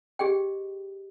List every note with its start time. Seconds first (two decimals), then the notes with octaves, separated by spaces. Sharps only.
0.19 G4 G#4 D#5 G5